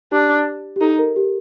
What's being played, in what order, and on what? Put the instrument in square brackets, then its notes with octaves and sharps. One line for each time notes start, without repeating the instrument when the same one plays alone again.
[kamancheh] D4 [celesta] G4
[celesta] G4
[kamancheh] D#4 [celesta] A4
[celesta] A#4
G4